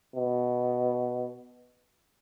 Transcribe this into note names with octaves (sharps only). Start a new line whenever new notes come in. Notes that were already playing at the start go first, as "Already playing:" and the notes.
B2